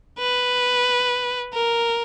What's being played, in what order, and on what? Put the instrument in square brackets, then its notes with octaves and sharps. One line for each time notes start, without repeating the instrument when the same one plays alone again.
[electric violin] B4
A#4